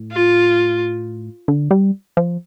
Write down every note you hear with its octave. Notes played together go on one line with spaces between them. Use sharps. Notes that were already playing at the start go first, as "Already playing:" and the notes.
Already playing: A2
F4
D3
G3
F3